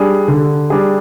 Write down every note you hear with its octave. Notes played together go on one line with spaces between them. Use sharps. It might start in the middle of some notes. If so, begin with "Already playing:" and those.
Already playing: G3 D4 G#4
D3
G3 D4 G#4